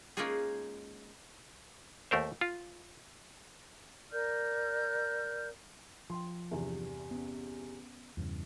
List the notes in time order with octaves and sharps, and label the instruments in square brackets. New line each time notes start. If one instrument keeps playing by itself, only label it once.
[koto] G#3 A#3 C#4 D#4 F4 G#4
[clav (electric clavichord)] D#2 A3 A#4 C5
F4
[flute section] A#4 D5 F6 G6
[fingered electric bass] F3 [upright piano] G5 C6
[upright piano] E2 G2 C3
[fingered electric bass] B3 C#4
E2 G2 C#3